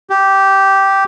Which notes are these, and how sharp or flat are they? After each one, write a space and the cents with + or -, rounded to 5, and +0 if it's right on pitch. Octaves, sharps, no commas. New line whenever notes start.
G4 -10